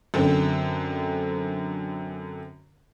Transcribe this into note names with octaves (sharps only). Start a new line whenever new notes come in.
F#2 D3 C4